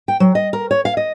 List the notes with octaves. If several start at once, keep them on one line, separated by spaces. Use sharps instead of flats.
G5
F#3
D#5
A#4
C#5
F5
D#5